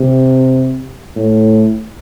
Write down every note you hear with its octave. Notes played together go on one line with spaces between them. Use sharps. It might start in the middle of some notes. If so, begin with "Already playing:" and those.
Already playing: C3
A2